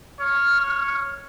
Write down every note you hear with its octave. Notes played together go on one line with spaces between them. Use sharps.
C#5 F6